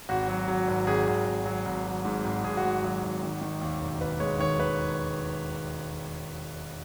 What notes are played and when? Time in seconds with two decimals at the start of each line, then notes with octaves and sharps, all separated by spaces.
0.09 G#1 F#4
0.28 F#3
0.48 F#3
0.68 G#1
0.87 G#1 G#4
1.07 G#1
1.26 G#1
1.46 F#3
1.65 G#1
1.86 F#3
2.05 G#2
2.24 G#1
2.44 G#1 G#4
2.57 F#4
2.63 G#2
2.83 F#3 F#4
3.03 G#1
3.23 D#3
3.41 D#3
3.61 D#2
3.81 E1
4.01 E1 B4
4.20 G#3 C#5
4.39 D#3 C#5
4.59 D#3 B4